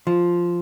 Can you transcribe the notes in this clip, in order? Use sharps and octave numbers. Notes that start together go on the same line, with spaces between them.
F3